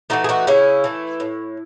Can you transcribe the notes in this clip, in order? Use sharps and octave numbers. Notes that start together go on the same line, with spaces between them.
E3 A3 D#4 F#4
G#4
D#4 F#4
C#3 C#4 E4
E3 A3
A2